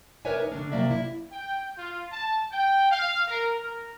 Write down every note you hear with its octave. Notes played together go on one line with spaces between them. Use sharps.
A#4 B4 C#5 D5 E5 G#5
D#4
D3 C#4 D4
C3 F#3 A#3 D5 E5
E4
G5
F4
A5
G5
F5
A#4
A#4